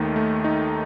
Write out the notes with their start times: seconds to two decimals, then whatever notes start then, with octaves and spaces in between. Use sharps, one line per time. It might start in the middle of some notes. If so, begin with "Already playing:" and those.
Already playing: D#2 D#3 A3 D#4
0.16 A3
0.44 D#4